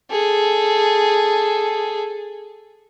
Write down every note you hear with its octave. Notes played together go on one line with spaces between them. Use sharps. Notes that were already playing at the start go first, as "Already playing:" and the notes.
G#4 A4